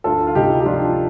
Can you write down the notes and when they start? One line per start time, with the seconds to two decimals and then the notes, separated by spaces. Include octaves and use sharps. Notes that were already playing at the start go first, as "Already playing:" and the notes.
0.04 D2 F4 A4
0.27 F4
0.35 C3 D#4 G4
0.60 G4
0.65 F3 D4 F4